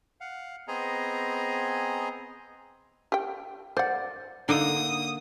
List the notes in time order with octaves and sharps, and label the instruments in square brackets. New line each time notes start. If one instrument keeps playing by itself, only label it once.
[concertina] F5 F#5
B3 C4 G#4 D#5 G#5 A#5
[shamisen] G4 G5
[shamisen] C5 F#5 [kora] D5
[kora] D3 A#3 D#4 [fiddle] D#6